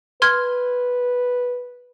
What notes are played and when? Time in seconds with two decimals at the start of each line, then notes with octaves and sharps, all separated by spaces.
0.22 B4 C6 F6 G#6